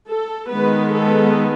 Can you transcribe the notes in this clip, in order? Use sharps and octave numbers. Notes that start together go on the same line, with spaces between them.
A4
D#3 G#3 B3 B4
A4